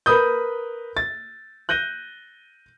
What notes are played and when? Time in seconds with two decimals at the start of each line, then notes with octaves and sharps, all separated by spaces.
0.06 A#4 B4 B5 D#6 G6
0.97 A6
1.69 F#6 G6 A#6 D#7 G7